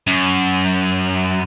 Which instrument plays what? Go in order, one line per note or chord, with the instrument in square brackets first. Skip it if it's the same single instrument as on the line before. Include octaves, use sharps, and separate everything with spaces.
[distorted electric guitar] F#2